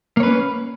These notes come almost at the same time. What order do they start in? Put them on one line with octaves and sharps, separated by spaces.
A#3 C#5 B4 C#4